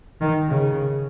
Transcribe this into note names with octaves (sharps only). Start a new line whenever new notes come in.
D#3
C#3